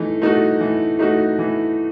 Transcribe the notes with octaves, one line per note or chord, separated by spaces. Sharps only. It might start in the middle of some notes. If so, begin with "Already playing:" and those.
Already playing: E3 A3 D#4
A3 D#4 F#4
E3
A3 D#4 F#4
E3